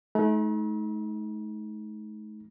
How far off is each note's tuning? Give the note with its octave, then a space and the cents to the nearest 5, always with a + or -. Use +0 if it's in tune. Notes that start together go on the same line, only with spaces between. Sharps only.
A3 -40 D#4 +20 A#5 +45